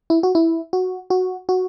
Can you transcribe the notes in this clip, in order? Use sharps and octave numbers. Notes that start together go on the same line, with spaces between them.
E4
F#4
E4
F#4
F#4
F#4